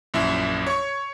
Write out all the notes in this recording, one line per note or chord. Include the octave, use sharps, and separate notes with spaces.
A#1 F#2 E4 E5
C#5 C#6